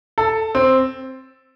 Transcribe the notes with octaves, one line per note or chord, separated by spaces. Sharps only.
A4
C4